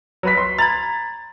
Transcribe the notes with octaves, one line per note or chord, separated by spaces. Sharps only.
F#3 B4 B6
C6
A#5 B5 G#6 A6